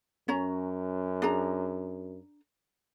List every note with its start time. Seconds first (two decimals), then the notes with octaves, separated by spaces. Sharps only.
0.28 F#2 C#4 C#5 A#5
1.22 D4 G#4 A#5